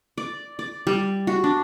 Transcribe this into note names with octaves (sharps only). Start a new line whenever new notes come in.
D5
D5
G3
F#4
D4